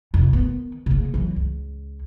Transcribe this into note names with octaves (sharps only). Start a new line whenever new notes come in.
C2 F2
D#3 B3
C#3 A#3
E3 F#3
C#2